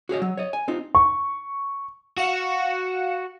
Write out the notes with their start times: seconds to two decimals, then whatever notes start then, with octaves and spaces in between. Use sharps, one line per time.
0.09 F#4 G#4 C#5 D#5
0.22 F#3
0.37 C#5 D#5
0.53 G#5
0.68 C4 D#4 F4
0.95 C#6
2.17 F#4 F5 C#7 E7